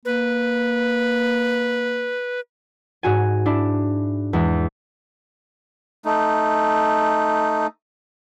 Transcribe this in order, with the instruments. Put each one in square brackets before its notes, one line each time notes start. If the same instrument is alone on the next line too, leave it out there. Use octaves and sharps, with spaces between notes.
[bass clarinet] A#3 [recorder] B4
[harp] G#2 F#4 G#5
D4 E4
E2 G#3
[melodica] A3 D#4